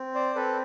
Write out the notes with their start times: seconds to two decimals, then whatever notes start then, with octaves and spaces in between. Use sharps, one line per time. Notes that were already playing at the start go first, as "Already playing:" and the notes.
Already playing: C4
0.15 C5 D5
0.35 C4 A4 B4